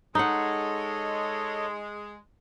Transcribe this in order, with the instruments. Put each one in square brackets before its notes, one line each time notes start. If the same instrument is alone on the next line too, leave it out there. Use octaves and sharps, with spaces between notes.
[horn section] G#3 [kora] D#4 F#5 [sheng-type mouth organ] A4 C#5 D#5